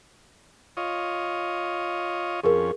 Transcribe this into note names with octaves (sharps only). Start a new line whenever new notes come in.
F4 C#5 D#5
F2 C#4 G#4 A#4